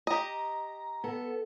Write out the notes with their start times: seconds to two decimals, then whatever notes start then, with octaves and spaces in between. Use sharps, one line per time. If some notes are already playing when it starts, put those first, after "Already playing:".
0.07 G4 D#5 A#5
1.04 B3 A4